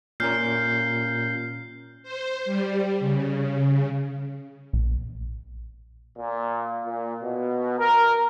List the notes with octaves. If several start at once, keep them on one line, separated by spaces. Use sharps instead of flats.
A#2 C#4 A#4 F6 G6 C7
C5
G3
C#3
A#1
A#2
A#2
B2
A#4